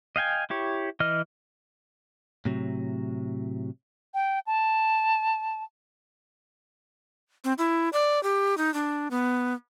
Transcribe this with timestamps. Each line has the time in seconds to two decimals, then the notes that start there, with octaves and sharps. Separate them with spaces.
0.16 D#5 F5 G5 G#5
0.50 E4 G4 C#5
1.00 E3 D#5 F6
2.45 A2 C3 F#3
4.14 G5
4.47 A5
7.44 C4
7.58 E4
7.93 D5
8.23 G4
8.57 D#4
8.74 D4
9.11 B3